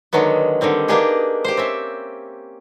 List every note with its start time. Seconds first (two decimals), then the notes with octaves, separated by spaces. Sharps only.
0.13 D3 D#3 F#3 G#3 B3
0.61 D3 D#3 G3 C4
0.88 A#3 B3 D4 D#4 G4 G#4
1.44 G4 C5
1.57 C4 C#4 E5